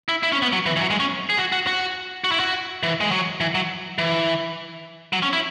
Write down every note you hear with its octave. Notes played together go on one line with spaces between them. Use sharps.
E4
E4
C#4
B3
F#3
E3
E3
F#3
G#3
C#4
G#4
F#4
F#4
F#4
F#4
E4
F#4
E3
G#3
F#3
E3
F#3
E3
F#3
C#4
E4